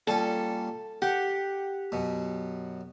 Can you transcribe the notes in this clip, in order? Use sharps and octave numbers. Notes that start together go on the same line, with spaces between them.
A#2 G3 C#4 A4
G4 F#5
F#2 B2